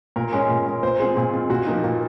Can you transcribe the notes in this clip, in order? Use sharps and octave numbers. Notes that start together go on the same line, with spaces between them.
A#2 A#4
G#3 C#4
A#2
G#3 C#4
A#2 C5
G#3 C4 F4 G#4
A#2
G#3 C4 F4
A#2 F#4
F3 A#3 D#4
A#2